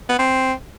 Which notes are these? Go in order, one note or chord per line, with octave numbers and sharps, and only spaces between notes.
B3
C4